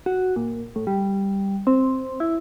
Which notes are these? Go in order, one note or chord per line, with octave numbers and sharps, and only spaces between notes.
F#4
A#2
A2
G3
C4
E4